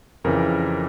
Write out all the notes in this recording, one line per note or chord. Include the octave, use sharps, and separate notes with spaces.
F2 C#3 E3 A#4